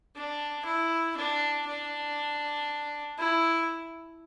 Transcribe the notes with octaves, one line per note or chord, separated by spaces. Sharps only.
D4
E4
D4
D4
E4